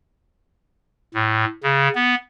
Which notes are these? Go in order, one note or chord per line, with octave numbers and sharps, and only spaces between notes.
A2
C#3
B3